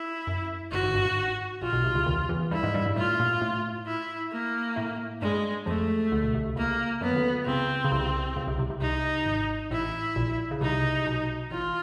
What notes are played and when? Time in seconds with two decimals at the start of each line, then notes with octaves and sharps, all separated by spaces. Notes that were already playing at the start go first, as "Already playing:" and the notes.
Already playing: E4
0.27 F#2
0.72 G1 G2 F#4
0.83 G#1 G#2
0.94 G1 G2
1.05 G#1 G#2
1.61 A#1 A#2 F4
1.73 B1 B2
1.84 C2 C3
1.95 C#2 C#3
2.06 D#2 D#3
2.29 E2 E3
2.51 G2 G3 E4
2.63 G#2 G#3
2.74 G2 G3
2.86 G2 G3
2.96 A2 A3 F4
3.20 A#2 A#3
3.41 A2 A3
3.87 E4
4.32 A#3
4.76 A2 A3
5.21 G2 G3 G#3
5.66 F2 F3 A3
6.12 D2 D3
6.23 B2
6.34 C2 C3
6.56 C#2 C#3 A#3
7.01 F#2 F#3 B3
7.12 D#3
7.16 D2 D3
7.46 C#2 C#3 C4
7.84 C#3
7.92 C2 C3
8.36 C#2 C#3
8.47 C2 C3
8.58 C2 C3
8.70 C2 C3
8.81 C2 C3 D#4
9.26 G#1 G#2
9.71 A1 A2 E4
10.16 A#1 A#2
10.51 C#3
10.61 C2 C3 D#4
11.06 B1 B2
11.51 A1 A2 F4